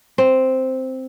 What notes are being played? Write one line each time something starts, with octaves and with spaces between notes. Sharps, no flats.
C4